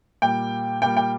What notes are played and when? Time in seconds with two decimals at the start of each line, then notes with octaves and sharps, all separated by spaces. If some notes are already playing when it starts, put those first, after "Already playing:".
0.22 A#2 G3 A#3 G5
0.82 A#2 G3 A#3 G5
0.97 G5